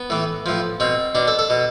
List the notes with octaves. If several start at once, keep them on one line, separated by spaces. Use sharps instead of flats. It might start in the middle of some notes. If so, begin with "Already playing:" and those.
Already playing: B3
A2 E3
A2 F3
B2 C4
B2 D4
A4
A4
B2